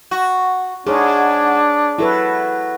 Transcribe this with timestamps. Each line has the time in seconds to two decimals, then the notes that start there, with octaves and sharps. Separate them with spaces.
0.11 F#4
0.87 G#2 D4 G#4 C#5
1.98 F#3 E4 A4 B4